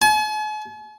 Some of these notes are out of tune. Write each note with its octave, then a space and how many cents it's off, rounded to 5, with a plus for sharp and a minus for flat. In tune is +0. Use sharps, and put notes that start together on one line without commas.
G#5 +45